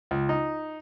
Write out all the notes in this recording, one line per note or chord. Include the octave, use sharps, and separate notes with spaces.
C#2
D#4